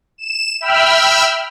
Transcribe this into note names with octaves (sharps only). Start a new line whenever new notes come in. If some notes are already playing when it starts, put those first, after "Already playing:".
E7
E5 G5 B5 E6 F6